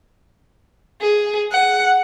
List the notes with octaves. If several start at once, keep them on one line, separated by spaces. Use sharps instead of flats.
G#4
F#5